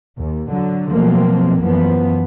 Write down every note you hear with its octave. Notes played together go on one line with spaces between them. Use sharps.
D#2
D3 F#3
B2 F3 F#3 A3 A#3 C4
F#2 E3 F3 B3